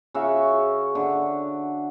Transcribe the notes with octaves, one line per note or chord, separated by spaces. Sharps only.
C#3 F#4 E5 F5
D3